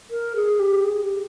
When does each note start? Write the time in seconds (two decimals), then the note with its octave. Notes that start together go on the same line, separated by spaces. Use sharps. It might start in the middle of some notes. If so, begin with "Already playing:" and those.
0.11 A#4
0.36 G#4
0.60 G4
0.84 G#4
1.03 G4